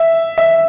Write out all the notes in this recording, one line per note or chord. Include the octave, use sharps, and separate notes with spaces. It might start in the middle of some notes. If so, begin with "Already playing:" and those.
Already playing: E5
E5